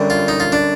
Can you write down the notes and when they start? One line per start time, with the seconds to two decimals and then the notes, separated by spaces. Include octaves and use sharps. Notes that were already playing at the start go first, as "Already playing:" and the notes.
Already playing: F#2 D3 G3
0.10 F4
0.28 D#4
0.40 F4
0.52 D4